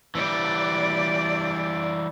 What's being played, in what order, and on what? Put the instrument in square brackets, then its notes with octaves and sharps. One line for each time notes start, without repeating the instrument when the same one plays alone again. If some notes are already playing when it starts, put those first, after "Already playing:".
[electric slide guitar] E3 G3 [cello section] D5